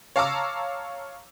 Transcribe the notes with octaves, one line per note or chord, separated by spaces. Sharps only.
C#5 F5 A5 A#5 D6 E6